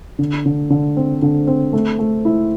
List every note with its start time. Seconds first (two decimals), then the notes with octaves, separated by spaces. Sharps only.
0.19 D3
0.46 D3
0.70 D3
0.96 C4
1.22 D3
1.47 C4
1.73 A3
1.99 A3
2.25 E4